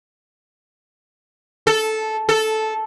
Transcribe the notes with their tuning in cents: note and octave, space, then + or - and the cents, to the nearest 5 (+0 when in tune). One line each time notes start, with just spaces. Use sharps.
A4 -10
A4 -10